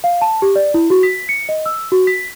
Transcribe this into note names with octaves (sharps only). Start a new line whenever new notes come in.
F5
A5
G4
D5
E4
F#4
B6
C#7
D#5
E6
F#4
B6